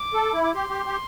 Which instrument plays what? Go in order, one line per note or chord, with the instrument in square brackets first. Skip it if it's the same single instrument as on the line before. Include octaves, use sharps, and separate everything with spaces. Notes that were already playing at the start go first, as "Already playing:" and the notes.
Already playing: [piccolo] D6
[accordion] A4
E4
[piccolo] D6
[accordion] G4 [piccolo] C6
[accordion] G4
G4